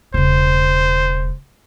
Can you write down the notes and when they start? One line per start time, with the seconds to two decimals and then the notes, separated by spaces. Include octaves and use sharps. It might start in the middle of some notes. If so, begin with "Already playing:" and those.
0.14 E1 C#3 C5